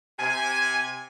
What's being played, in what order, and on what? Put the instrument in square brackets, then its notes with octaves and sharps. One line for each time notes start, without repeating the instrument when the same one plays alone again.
[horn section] C3 G#5